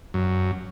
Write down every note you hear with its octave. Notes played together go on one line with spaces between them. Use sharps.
F#2